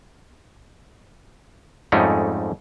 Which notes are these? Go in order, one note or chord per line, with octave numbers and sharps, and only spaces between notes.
F2 G#2 G3 A3 C#4 D#4